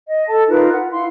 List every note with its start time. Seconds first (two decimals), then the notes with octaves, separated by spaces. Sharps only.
0.08 D#5
0.28 A4 A5
0.48 D#4 F4 A#4 B4
0.73 F#5
0.91 E4 F5 C6